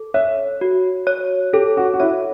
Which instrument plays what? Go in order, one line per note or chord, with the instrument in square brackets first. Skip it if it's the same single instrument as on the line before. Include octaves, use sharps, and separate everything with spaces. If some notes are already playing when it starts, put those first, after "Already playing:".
Already playing: [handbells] A4
[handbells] C#5 [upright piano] E5
[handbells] F#4
C#5
[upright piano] G4 [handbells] A4
[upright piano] F#4
F#4
[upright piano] E4 [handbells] C#5